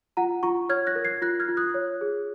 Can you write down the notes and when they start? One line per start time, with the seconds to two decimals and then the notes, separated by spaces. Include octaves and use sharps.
0.17 F4 F#5 A#5
0.43 F4 A#5 C#6
0.69 C#5 F6 G#6
0.87 F#6 A#6
0.96 A#4
1.05 G#6 C7
1.22 F4 F#6 A#6
1.40 F6 G#6
1.48 F4
1.57 D#6 F#6
1.74 C#5
2.01 G#4